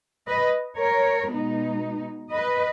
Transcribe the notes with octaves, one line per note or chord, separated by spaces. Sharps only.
B4 D#5
A#4 C#5
B2 G#3 B3 D#4
B4 D#5